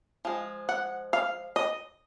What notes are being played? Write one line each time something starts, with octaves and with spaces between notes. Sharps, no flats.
F3 G#3
F#5
F5
D#5